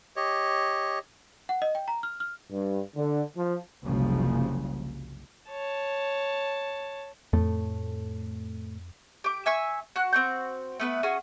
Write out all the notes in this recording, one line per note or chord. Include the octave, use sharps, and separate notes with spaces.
G4 C#5 D#5
F#5
D#5
G5
A#5
F6
F6
G2
D3
F3
F#1 C2 C#3 F3
C#5 A5
F2 A2 A3
G4 D6
E5 G#5 C#6 E6
F#4 F#6
C4 F#4 G6
A3 B3 B4
C#4 F#4 G#4